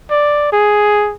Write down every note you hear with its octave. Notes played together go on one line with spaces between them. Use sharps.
D5
G#4